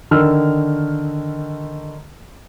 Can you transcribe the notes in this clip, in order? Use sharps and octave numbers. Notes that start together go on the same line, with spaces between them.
D3 D#3 E6 F6